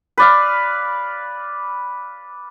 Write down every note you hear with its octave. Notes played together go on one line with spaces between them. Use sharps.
B4 D5 F5